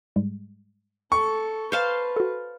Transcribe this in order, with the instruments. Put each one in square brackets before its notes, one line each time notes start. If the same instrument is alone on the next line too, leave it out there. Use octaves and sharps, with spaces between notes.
[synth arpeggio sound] G#2 G3 G#3
[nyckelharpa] A4 [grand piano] C#6
[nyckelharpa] B4 [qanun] C5 F5 A5 [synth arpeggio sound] C#7
[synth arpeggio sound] F#4 A4